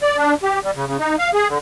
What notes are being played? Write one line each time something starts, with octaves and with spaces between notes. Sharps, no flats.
D5
D4
G4
G3
C#3
C#3
D#4
F5
G#4
D3